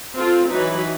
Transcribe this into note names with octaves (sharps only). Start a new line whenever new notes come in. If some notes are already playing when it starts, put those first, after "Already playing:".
C4 F4 A4
E3 F#3 D#4 B4